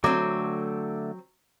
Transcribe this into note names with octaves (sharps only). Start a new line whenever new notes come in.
D3 F#3 A3 C4 D6